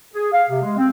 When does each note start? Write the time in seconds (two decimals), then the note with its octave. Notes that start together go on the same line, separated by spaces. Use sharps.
0.14 G#4
0.33 F5
0.49 C3
0.62 G#3
0.77 C4